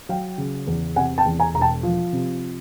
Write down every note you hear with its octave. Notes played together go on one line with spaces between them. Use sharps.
F#3 F5 G5
C#3
E2
C3 F#5 G#5
G5 A5
E2
G#5 A#5
E1 A#5
G5 A5
F3
C3